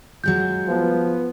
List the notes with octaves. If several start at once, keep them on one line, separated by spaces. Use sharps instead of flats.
F#3 G#3 F4 G6
F3 B3